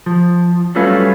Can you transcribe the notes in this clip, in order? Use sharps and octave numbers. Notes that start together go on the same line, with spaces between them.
F3
F#3 G3 A3 C#4 F4 B4